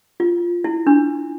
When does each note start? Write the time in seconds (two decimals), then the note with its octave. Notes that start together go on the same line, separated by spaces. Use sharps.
0.20 F4
0.64 E4
0.87 D4